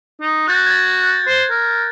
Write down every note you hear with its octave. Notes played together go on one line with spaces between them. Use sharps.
D#4
F#4 F#6 G6 A6
G#6 A6
C5
A#4